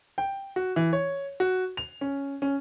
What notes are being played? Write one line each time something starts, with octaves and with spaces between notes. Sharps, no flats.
G5
F#4
E3
C#5
F#4
F7
C#4
C#4